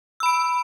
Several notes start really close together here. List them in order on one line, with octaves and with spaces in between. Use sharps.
E6 B5 D7